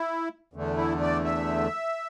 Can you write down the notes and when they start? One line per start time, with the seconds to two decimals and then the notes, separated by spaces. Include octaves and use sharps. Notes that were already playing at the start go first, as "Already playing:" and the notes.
Already playing: E4
0.54 E2 D3 A3
0.77 E4
1.01 D5
1.24 E5